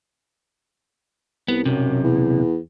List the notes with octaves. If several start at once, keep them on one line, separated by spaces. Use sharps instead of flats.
C2 B3
B1 F#2 C3
E2